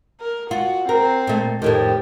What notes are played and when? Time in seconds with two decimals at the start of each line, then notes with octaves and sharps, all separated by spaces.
0.20 A#4
0.51 F4 F#4
0.89 C4 A#4
1.27 A#2 A3
1.62 F2 A2 D#3 G4